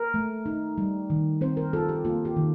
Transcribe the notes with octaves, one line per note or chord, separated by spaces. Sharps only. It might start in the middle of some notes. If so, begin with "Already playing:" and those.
Already playing: A#4
A3
D#4
G3
D#3
C4 C5
A#4
F4 A4
G4
A#3 F4
G4
D#3